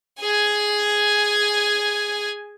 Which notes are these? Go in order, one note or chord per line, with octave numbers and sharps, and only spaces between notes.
G#4 G#5